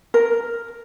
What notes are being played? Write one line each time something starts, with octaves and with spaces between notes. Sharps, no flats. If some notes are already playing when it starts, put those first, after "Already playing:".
A#4